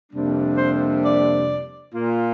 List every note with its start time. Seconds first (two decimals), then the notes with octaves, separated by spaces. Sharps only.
0.12 F2 C3 G3 A#3 D4
0.58 C5
1.04 D5
1.95 A#2 A#3 F4